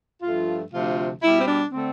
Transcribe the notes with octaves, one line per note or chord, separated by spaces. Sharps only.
G2 F3 A3 F4
D2 C3 F3 A3 F4
B2 G3 E4
C4
D4
D3 A3 C4